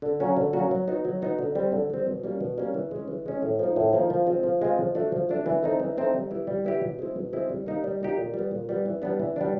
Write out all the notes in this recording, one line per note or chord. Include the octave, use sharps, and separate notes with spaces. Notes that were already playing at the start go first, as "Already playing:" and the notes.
D3
F#3 A#3 C#4 F#4
D3
F#3 A#3 C#4 F#4
F#3
B3 D#4 F#4
F#3
B3 D#4 F#4
D3
G3 C4
D3
G3 C4
B2
G3 A#3 C#4
B2
G3 A#3 C#4
E3
G#3 C#4
E3
G#3 C#4
A2
F3 A#3 D#4
A2
F3 A#3 D#4
F3
G#3 C4 F4
F3
G#3 C4 F4
F3
A3 D4 F#4
F3
A3 D4 F#4
E3
A3 C4 D#4
E3
A3 C4 D#4
G3
B3 E4 G4
G3
B3 E4 G4
B2
G#3 C4 E4
B2
G#3 C4 E4
G3
A#3 D#4 G4
G3
A#3 D#4 G4
A#2
G3
B3
A#2
G3 B3
E3
G3 B3 D4
E3
G3 B3 D4